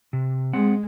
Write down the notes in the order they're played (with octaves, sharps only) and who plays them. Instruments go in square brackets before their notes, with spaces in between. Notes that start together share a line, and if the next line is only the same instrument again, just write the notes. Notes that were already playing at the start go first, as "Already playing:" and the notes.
[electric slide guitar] C3
[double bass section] G#3 [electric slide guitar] C4 F#5